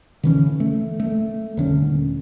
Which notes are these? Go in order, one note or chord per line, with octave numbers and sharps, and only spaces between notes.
D3 E3 C#4
A3
A3
D#1 D3 C#4